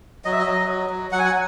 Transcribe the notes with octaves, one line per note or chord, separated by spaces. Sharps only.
F#3 D#5
E5
D#5
F#3
F#3
F#3
F#3 F#5
G#5
F#5